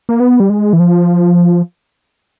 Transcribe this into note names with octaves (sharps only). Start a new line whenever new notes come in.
A#3
B3
G3
G#3
E3
F3